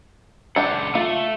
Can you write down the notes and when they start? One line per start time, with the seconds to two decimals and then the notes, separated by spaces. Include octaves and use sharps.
0.56 C#2 D4 F#5 G5
0.95 A3 F4